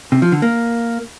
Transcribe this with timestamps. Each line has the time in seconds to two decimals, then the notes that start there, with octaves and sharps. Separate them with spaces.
0.12 C3
0.22 F3
0.32 D3
0.42 A#3